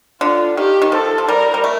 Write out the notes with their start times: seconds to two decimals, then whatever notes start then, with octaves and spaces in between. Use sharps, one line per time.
0.21 D3 F4
0.57 D#3 G4
0.82 D#3
0.92 F3 A4
1.18 F3
1.28 G3 A#4
1.54 G3
1.64 A3